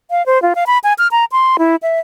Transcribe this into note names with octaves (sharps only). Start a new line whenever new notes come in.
F5
C5
F4
F5
B5
G#5
F6
A#5
C6
E4
E5